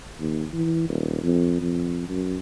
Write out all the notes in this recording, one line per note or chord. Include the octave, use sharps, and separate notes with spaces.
D#2
E3
D#1
F2
F2
F#2